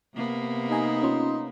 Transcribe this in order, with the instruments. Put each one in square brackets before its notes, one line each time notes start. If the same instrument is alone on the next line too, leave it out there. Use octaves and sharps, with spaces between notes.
[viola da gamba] C3 A#3 B3
[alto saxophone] D#4 [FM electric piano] G4 G#5 A#5
[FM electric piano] C#4 F4 C6